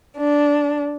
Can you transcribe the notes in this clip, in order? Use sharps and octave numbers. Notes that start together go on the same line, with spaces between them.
D4